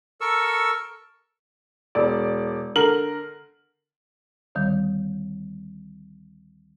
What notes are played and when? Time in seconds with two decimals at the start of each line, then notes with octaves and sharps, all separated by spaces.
0.21 A4 A#4 C#6 E6
1.95 E1 D5
2.76 D3 A#4 F#7
4.55 D2 D3 D#3 G3